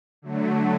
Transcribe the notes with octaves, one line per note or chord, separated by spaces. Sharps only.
D3 F#3 A3